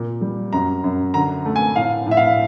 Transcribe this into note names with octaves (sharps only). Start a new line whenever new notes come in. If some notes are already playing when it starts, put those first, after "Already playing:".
Already playing: A#2
G3
F#2 A#5
F#2
D3 A#5
A3
G#5
A2 F5
A2 E5
F5